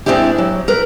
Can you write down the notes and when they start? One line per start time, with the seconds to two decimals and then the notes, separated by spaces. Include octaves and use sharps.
0.06 G#3 A#3 C4 D4 E4 G4
0.38 F#3
0.68 A#4 B4